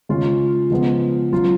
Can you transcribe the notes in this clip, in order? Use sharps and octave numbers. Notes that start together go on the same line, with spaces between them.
C#3 G#3 C#4 F4
C#3 F3 G#3 B3
F#3 C#4 F4